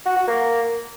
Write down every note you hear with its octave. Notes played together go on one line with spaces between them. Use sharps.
F#4
F#4
A#3